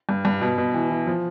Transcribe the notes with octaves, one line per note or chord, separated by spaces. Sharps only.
G2
G2
B2
B2
E3
E3
F3